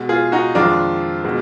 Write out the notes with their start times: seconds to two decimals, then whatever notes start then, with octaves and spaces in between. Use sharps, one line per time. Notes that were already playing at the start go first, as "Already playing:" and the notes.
Already playing: B2 G#3
0.09 F4 G#4
0.32 D#4 F#4
0.55 F2 D#3 G#3 D4 F4
1.24 B2 G#3